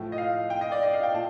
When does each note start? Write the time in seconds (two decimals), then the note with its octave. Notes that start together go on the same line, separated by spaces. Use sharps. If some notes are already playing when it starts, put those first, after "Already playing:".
Already playing: A2 F3
0.12 D#5
0.18 F5
0.50 G5
0.61 D#5
0.72 D5
0.83 D#5
0.94 F5
1.03 G5
1.14 A#2 A5